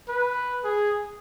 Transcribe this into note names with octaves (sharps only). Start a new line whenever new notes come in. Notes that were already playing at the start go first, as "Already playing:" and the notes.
B4
G#4